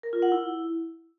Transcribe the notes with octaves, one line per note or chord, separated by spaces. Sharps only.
A#4
F4
F#5
E4